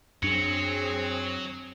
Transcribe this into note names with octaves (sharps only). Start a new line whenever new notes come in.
F#2 F#3 C4 D4 G#4 C#7